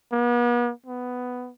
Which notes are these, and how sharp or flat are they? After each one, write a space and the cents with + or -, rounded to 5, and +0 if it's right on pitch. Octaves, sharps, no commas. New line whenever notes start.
B3 -40
B3 +10